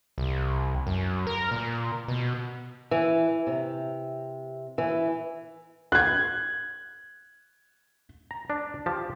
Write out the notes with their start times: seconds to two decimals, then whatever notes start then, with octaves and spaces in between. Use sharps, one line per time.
0.18 C2
0.87 F#2
1.27 A#4
1.52 A#2
2.08 B2
2.91 E3
3.47 C3
4.78 E3
5.92 F#6 G#6
8.31 A#5
8.50 D4
8.86 F3 G4 A5